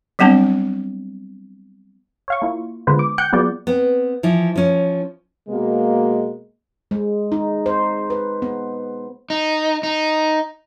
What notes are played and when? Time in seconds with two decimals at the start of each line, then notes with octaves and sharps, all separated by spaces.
0.19 F#3 G3 B3 C4 D4
2.28 C#5 F5 C#6
2.42 A#3 E4 F4
2.87 D3 G#3 B3 F4 B4 C5
2.99 D6
3.18 F#5 G5 F#6 G6 C#7
3.32 F#3 B3 F4 F#4 G#4 D5
3.67 B3 C4
4.23 E3 F3
4.56 F3 C#4
5.49 B2 G#3 A#3
6.91 G#3
7.32 D#4
7.66 C5
8.10 B4
8.42 B3
9.30 D#4
9.83 D#4